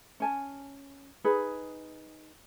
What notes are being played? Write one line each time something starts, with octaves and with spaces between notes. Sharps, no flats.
C#4 G#5 A5
D#4 G#4 B4